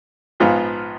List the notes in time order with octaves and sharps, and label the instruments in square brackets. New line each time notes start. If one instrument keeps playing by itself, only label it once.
[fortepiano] A#1 G#2 F3 B3 F4